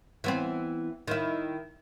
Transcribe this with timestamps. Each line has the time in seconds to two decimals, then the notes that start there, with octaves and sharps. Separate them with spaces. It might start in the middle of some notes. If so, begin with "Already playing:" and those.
0.24 E3 B3 C4
1.08 D#3 E4